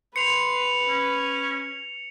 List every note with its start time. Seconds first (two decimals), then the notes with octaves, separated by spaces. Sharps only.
0.16 B4 C6 C#7 F7
0.89 C#4